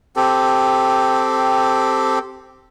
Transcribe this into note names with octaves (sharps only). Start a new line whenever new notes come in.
C4 G4 A4